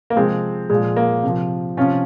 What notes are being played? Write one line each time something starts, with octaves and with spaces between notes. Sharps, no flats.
A#3
C3 F3 G#3 C4
A#2 F3 G#3
A#3
C3 F3
C3 F3 C#4 F4